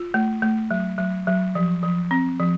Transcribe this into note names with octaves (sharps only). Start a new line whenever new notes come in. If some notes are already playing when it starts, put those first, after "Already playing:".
Already playing: F4
A3
A3
F#3
F#3
F#3
F3
F3
C4
F3